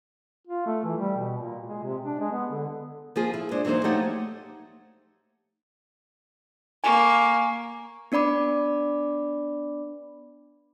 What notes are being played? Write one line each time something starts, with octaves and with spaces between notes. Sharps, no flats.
F4
A3
E3
G3
B2
A#2
G#3
C3
D4
G#3
B3
D3
F3 A#3 F4 G#4
E4
G#3 D4 C5
E3 F#3 A#3 D#4 C5
F3 A3 D#4 G4 C#5 F#5
A#3 G#5 C#6
B3 D4 D5 B5 D6